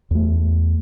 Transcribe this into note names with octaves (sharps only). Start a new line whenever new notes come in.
E2 A3